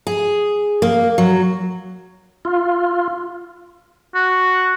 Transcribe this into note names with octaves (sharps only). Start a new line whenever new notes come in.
G#4
A#3
F#3
F4
F#4